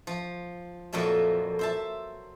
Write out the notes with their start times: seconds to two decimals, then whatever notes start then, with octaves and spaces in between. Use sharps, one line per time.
0.07 F3
0.93 F2 A#2 F#3 A4 E5
1.59 C5 E5 A5